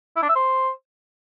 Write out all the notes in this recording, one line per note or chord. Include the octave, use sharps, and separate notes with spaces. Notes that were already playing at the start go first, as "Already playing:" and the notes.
E4
D4
E5
C5